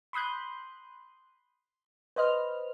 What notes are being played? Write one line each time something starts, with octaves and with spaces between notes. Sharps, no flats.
B5 C6 D#6 F#6 G6
B4 C5 D#5 F6